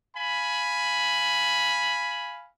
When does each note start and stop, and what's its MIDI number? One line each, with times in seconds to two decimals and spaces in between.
0.16 2.49 77
0.16 2.49 80
0.16 2.49 83